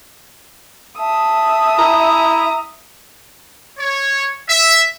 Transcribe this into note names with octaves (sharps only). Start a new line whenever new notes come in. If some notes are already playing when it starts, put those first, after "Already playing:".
E5 A5 D#6
E4 A#5
C#5
E5